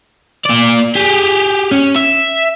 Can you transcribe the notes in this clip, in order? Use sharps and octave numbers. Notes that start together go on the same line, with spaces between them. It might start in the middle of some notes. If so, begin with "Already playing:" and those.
A#3 D5
G4 G#4
C#4
E5